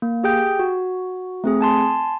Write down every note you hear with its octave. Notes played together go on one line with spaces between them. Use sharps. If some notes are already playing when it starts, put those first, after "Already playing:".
A#3
G4 G#4 G5 G6
F#4
A3 C4 G#4
G#5 A5 C6